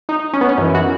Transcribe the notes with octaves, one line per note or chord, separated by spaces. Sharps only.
D#4
C#4
B3
C#4
F#2 E3 D#4
E4
F#4